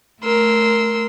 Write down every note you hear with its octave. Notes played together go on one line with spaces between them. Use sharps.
A3 A#4 C6 E6